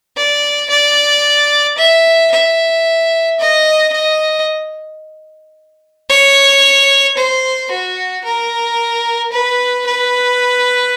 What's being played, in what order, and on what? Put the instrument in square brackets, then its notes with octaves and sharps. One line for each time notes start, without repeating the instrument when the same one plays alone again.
[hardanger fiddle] D5
D5
E5
E5
D#5
D#5
C#5
C5
F#4
A#4
B4
B4